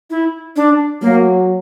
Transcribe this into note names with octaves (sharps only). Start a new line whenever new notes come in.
E4
D4
F#3 A#3